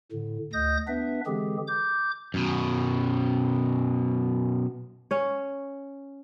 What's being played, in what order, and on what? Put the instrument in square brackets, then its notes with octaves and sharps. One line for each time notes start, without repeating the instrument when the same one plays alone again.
[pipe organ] A2 D3
D2 D#5 D#6 G6 A#6
B3 D4 B4 E5
D3 E3 G#3 C4 G4 G#4
D6 G6
[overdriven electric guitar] F#2 B2
[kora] C#4 C#5